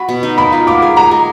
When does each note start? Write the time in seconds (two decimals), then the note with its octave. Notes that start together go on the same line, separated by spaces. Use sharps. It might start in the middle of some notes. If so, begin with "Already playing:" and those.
Already playing: F#4 B5
0.09 B2
0.23 D#4
0.38 A#3 B5
0.52 F4
0.67 A#3 D6
0.82 G#4
0.96 G#4 A#5
1.11 G#3